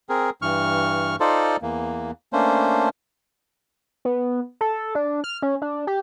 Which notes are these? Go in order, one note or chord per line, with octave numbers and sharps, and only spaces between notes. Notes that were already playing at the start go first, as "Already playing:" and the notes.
C4 G#4 A#4
G2 E3 C#6 F6
D#4 F4 A4 C5 D5
E2 E3 A#3
A3 A#3 C#4 D4 C5
B3
A4
D4
F6
C#4
D4
G4